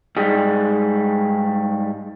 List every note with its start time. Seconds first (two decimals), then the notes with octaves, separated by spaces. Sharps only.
0.16 G#2 G3 G#3